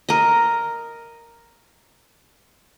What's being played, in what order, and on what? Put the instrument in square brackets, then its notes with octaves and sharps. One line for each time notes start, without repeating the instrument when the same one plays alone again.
[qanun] A#4 D#5